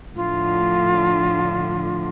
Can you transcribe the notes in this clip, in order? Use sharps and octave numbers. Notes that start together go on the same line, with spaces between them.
A2 D3 F3 F4